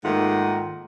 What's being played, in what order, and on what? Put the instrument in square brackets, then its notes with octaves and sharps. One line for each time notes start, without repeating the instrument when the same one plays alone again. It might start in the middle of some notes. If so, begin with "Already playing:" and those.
[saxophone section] G#2 D#3 A3 A#3 F4 F#5